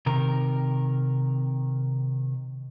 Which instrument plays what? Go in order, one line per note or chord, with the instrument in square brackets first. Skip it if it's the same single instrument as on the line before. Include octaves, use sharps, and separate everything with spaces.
[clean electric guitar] C3 D#3 A#4